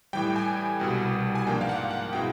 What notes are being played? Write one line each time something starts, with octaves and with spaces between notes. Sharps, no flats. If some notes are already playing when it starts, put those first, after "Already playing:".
A2 E3 G3 G5
G#5
C2 B2 G3
G#5
G#2 F3 A#3 D4 G5
F5
F#5
F#5
B2 G#3 C4 E4 G5